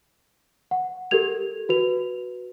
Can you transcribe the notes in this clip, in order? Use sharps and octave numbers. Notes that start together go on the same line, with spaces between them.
F#5
G4 A4 A#4 G#6 F7
F#4 B4 F7